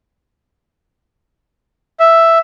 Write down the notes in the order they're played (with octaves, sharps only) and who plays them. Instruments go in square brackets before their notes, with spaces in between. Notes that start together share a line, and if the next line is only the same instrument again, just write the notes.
[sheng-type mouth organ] E5